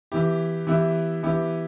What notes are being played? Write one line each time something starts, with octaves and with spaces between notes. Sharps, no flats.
E3 B3 E4 G4
E3 B3 E4 G4
E3 B3 E4 G4